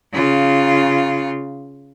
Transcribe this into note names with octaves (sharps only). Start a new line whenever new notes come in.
C#3 F4